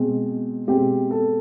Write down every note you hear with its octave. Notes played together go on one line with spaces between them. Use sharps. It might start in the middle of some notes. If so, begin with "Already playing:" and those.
Already playing: B2 G#3 C4
B2 G#3 C4 G4
A4